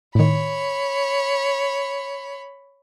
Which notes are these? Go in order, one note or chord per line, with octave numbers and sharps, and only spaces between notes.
A2 D#3 C#5 B5